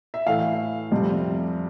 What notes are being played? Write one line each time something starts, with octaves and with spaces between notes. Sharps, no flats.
E5
A2 E3 A3 F5
F2 C3 G3